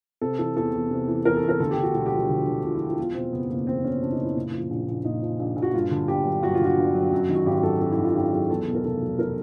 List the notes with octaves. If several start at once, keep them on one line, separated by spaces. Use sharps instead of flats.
C3 A4
E3 A4
E2 A4
E2
C3
E3
E2 A#4
A4
E2
A#4
D2 A4
G4
D3
F#4
E1 F#4
G4
F3 F#4
D2
D3
E1 F4
E4
F3
F4
E2 F4
B2 C4
F#1 B3
F#1 A#3
E2 C4
B2 C#4
F#1 D4
D#4
F#1
E4
A#2
F3
A#1
A#1
A#2 D#4
F3
A#1
A#1
F#4
G2 F4
D3
G1 G4
F#3
G2 F#4
F4
D3
F#4
G1
F#3
F#2
D#3
F#4
G#1 G4
F#3 A4
F#2 A4
E4
D#3
F4
G#1 G4
F#3 G#4
E2 A4
B2
A#4
F1 A4
F#3
A#4